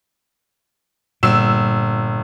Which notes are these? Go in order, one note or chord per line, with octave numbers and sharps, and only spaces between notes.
G1 A#2 E6 E7